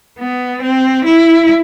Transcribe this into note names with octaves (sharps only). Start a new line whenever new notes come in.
B3
C4
E4